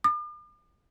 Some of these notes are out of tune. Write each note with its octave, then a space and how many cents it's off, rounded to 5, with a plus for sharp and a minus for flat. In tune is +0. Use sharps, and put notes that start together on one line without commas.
D6 +45